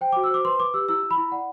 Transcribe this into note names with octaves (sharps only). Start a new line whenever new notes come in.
C5 G5
F#4 D6
E6
C5 D6
B4 C6
B4 D6
G4 E6
E4 E6
E4
B5
E4
D5 F#5